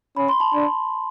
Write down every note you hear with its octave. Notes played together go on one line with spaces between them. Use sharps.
C#4 B5
C6
A5 B5
D4